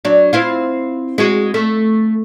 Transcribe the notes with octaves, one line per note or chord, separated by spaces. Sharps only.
F#3 D4
C4 E4 F4
G#3 F#4
A3